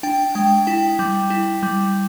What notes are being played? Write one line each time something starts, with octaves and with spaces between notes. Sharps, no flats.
D4 G5
G#3 G5
E4 G5
G3
E4
G3